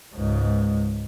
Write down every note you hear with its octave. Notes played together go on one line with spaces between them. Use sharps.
C#2 G#2